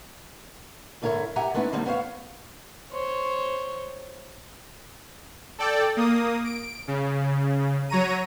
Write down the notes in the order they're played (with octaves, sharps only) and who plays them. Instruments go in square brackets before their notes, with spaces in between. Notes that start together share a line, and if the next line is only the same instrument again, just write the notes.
[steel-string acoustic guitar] G#2 D3 E4 A#4 C#5
G4 E5 F#5 G#5 A#5
G#3 A3 B3 C#4 D#4 E4
D3 G3 G#3 A#3 C4 D#4
B3 C5 C#5 F5
[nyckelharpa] C5 C#5
[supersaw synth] A4 D5 G5
A#3 D#6
D7
C#3
F#3 C#5 A#5 D#7